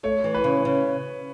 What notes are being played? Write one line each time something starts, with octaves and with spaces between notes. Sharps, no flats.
A3 C#5
E3
B4
C#3
C#3